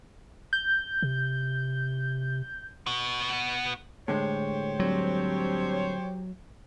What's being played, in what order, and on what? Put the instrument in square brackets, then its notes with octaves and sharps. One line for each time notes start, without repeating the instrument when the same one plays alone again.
[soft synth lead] G6
[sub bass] C3
[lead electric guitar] B3 F#4
[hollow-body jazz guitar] A2 D3 G#3 [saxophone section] G4 C5 C#5
[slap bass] F#3 [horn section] G3 C4 D4